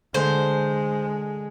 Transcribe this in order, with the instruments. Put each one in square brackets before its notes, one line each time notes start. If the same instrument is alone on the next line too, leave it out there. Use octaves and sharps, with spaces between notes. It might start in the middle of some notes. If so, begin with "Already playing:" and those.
[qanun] D3 [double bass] G#3 [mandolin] C5